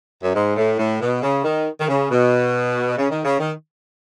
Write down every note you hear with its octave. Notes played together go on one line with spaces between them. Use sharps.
F#2
G#2
A2
A2
B2
C#3
D#3
D#3
C#3
B2
C#3
D#3
C#3
D#3